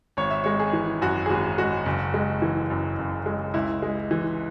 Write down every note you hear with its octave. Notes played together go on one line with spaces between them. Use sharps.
G#1 C#5
E5
G#3 C#5
G#4
E3
F#2 F#4
G#4
G#1 F#4
G#3 F#4
F#1
G#3
E3
F#2
F#1
G#3
C#2 E4
G#3
E3